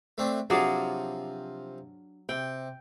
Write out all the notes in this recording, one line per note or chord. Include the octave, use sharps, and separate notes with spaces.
A3 C4 D4
C3 F3 F#3 D4 F4 G#4
C3 G5